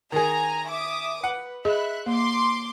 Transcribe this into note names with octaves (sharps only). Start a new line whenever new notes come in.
D#3 G#4 G#5 A#5
E5 D6 D#6
B4 F#5
G#4 D#5 E5 B5 F#6
A#3 C6 D6